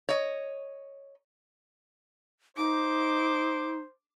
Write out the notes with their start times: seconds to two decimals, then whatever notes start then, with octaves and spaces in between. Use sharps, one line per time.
0.09 C#5 D#5
2.57 D#4 C5 D6